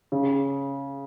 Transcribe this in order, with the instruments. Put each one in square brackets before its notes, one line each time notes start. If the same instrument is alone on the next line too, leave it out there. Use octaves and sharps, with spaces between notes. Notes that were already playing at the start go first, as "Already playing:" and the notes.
[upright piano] C#3